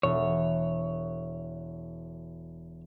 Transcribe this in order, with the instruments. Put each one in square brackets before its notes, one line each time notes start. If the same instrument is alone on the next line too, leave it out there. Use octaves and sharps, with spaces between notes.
[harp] E1 [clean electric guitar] C#5